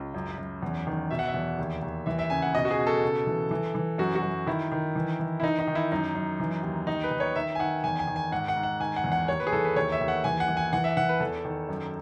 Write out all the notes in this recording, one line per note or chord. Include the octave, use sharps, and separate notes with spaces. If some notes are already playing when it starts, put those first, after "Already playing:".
Already playing: C#2
F#2
F#2
E2
D#3
B2 E5
F#5
E5
E2
D#2
D#2
E3 E5
E5
C#3 G#5
F#5
B2 D#5
F#4
G#4
B2
A4
C#3
E3
E3
E3
F#2 F#4
F#4
F#2
D#3 E4
D#3
E3
E3
E4
D#3 D#4
D#4
D#3
E4
F#2 D#4
F#2
E3
D#2
D#3 D#4
B4
D#3
C#5
D#3 E5
G#5
D#3 F#5
E2 G#5
G#5
D#3
G#5
G#2 F#5
F#5
G#2
F#5
D#3 G#5
F#5
E2
F#5
D#2 C#5
B4
G#4
E3 A4
B4
D#2 C#5
E5
D#2
F#5
E3 G#5
F#5
E3
G#5
E3 F#5
E5
E3 F#5
B4
E2 A4
D#3
F#2